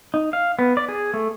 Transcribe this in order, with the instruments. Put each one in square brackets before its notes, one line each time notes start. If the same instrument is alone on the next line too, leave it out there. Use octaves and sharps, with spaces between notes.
[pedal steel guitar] D#4
F5
B3
D5
G#4
A3